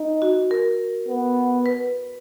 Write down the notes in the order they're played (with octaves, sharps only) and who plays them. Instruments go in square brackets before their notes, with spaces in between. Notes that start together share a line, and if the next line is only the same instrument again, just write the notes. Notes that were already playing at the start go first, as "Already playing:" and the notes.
Already playing: [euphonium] D#4
[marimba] F#4
A#4
[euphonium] B3
[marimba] B4